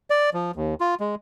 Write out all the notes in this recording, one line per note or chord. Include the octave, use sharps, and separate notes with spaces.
D5
F3
D#2
F4
G#3